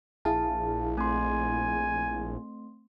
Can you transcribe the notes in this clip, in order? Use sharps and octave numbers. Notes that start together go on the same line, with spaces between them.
A#1 E4 G#4 F5 A5
A3 C4 G#5 C6